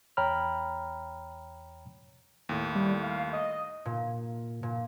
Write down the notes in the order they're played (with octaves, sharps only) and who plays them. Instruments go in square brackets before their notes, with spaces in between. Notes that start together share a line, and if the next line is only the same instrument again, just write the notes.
[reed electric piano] E2 C#5 G5 A#5 B5 F6
[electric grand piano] D#2 A2
[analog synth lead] G3
F5
D#5
[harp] A#2
A#2